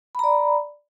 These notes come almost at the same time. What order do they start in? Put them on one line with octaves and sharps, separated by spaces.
B5 A#5 D5